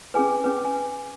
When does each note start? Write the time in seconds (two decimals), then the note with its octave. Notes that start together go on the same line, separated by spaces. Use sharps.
0.14 C#4 G#4 B4 G#5
0.44 C#4 G#4 B4
0.65 G#5